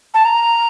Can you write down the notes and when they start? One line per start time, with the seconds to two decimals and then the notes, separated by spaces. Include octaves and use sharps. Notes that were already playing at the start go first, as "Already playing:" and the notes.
0.14 A5
0.25 A#5